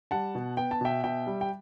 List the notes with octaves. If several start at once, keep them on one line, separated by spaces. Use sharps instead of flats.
G3 F#5 A5
B2
B3 G5
A5
B2 E5 G5
B2 E5 G5
G3
G5